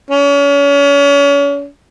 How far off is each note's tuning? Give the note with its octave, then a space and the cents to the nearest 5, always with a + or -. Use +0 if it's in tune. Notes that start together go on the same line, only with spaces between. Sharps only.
C#4 +35